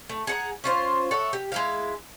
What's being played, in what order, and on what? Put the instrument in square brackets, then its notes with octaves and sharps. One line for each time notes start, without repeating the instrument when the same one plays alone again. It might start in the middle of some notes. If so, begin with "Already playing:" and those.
[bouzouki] A3
G#4 F#5 A#5
C#4 F4 C5
A4 C#5 E5 F#5
G4
G#3 E4 F5